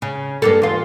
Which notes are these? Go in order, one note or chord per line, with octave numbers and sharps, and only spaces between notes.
C#3
G2 A#3 A4
E2 F4